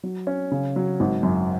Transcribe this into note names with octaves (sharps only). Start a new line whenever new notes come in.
F#3
C#4
C#3
F#3
G#1
F#2